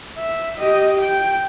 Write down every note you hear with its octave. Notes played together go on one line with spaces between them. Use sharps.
E5
G4 D#5
G5